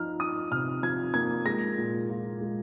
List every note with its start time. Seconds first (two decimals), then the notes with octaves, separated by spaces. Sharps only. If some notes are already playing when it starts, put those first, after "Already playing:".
Already playing: F3 D#4 F6
0.20 D#4 D#6
0.51 C3 F6
0.83 F3 G#6
1.14 A#3 G#6
1.46 G#3 A#6
1.78 A#2
2.09 F4
2.41 G#3